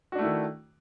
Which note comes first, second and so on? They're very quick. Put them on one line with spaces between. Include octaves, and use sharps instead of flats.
F#4 D4 A3 E4 D#3